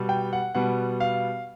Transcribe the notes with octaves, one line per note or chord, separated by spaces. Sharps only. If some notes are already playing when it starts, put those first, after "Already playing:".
Already playing: B2 G3 B3
G5
F#5
B2 G3 B3 F#5
F5